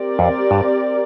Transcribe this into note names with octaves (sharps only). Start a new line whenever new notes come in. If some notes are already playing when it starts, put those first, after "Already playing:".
Already playing: C4 G4 A#4 D5
F2
G2